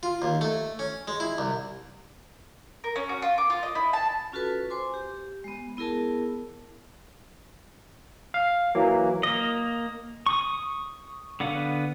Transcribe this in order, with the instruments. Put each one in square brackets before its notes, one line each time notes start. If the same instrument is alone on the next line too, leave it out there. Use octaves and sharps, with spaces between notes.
[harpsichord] F4
D#2
A3
C#4
G#3
E4
C2
[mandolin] A#4
C#4
F#4
F4
D6
F4
D#5
E4
A5
[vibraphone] C#4 F4 F#4 A4 B4
C5 G#5 C6 D6
G4
G#3 B3
B3 E4 G#4 A#4 A5
[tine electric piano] F5
E3 F#3 A#3
[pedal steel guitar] A#3 D#5
C#6 D#6
D3 B3 F5 F#5